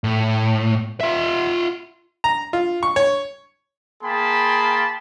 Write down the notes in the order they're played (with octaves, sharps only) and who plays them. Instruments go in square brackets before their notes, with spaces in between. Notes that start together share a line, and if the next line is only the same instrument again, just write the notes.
[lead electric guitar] A2
F4 E5
[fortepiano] A#5
F4
C#6
C#5
[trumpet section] A#3 G#4 G5 A5 B5 C6